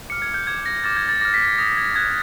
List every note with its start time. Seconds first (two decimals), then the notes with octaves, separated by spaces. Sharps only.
0.10 D6 F6 C#7
0.22 G#6
0.34 G6
0.47 D6 G6 G#6
0.66 A#6
0.84 D6 F6 A6
0.97 G#6
1.09 A6
1.21 D6 F6 A#6
1.34 B6
1.46 B6
1.58 D#6 G6 A#6
1.77 G#6
1.95 D6 F#6 G#6